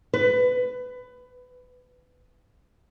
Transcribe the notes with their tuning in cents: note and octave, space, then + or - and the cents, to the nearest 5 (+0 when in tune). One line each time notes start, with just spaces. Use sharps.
B4 +20